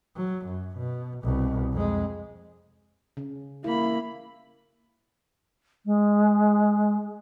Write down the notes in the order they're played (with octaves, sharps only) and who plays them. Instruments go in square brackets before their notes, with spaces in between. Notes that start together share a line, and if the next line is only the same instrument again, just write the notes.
[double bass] F#3
F#2
B2
C2 B2
F2 G#3
[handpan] C#3
[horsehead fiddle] A#3 B5 [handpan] E4
[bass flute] G#3